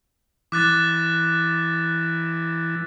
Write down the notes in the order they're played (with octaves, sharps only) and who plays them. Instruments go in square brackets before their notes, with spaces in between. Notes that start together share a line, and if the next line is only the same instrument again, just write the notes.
[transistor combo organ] E3 [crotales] D6 F#6 A6